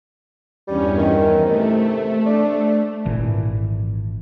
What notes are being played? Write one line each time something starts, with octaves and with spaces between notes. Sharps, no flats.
E2 G2 G3 C#4
D#3 E3
C3 A3
D4
G#1 A#2 E3